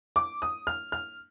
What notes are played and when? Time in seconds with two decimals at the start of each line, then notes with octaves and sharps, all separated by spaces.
0.16 D6
0.42 D#6
0.67 F6
0.92 F6